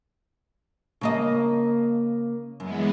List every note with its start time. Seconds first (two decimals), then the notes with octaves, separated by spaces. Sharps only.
1.01 C#3 A#3 D#5
2.60 F#2 E3 G#3 B3